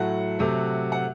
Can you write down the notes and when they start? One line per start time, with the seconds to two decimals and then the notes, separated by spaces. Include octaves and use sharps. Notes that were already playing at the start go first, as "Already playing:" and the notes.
Already playing: A2 F#3 A3 F#5
0.39 C3 F#3 A3
0.92 F#5